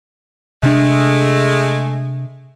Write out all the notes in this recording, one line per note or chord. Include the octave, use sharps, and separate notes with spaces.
C3 G#3 A3 D4